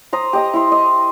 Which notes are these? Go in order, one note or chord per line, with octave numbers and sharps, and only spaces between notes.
C5 A#5 D#6
G4 D#5 A#5
E4 C6
D#5